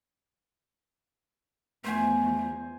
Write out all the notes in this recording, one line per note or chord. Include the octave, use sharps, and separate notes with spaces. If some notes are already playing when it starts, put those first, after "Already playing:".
E2 F3 A3 C5 G#5